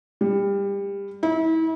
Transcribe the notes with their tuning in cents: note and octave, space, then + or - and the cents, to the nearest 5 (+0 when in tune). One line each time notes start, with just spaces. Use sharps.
G3 +25
E4 -35